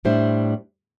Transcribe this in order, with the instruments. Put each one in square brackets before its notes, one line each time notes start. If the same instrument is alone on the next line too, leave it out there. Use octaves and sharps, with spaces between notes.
[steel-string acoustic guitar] A2 G3 D4 C5 E5